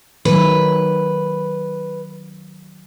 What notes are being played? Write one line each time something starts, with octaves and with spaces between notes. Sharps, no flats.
D#3 F#3 B4